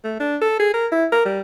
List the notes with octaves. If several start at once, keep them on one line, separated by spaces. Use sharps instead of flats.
A3
D4
A4
G#4
A#4
E4
A#4
G3